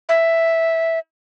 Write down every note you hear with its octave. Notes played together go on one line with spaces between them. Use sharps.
E5